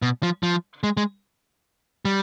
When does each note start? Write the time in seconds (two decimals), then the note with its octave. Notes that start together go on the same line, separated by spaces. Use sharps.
0.02 B2
0.23 F3
0.43 F3
0.83 G#3
0.97 G#3
2.05 G3